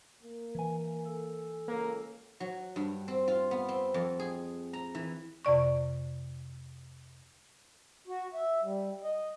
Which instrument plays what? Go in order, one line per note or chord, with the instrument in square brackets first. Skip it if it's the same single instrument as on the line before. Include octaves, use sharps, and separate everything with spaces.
[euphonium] A#3
[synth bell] E3 G#5
[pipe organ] A4
[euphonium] C#2 [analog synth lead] A#3
[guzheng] F#3
G2
C4
F4
B3
C4
F2
G#4
A#5
E3
[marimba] F2 C3 D5 C#6
[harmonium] F#4
E5
G3
D#5